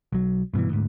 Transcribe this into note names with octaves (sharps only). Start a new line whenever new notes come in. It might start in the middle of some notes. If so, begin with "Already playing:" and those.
B1 F#3
G2 B2 D3 E3
D2 G#2